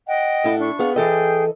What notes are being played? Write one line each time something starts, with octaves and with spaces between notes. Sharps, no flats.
D#5 F#5 G5
A2 E4 A4
D4 C#6
B3 G#4 F5
E3 G#4 A4 D#5 G5